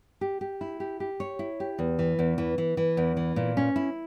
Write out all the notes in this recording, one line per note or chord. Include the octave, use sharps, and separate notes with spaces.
G4
G4
E4
G4
G4
C#5
E4
G4
E2
E3
E2
E3
E3
E3
E2
E3
A#2
C#4
E4